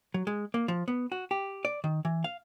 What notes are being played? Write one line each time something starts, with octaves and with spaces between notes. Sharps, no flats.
F#3
G#3
A#3
F3
B3
F#4
G4
D5
D#3
E3
F5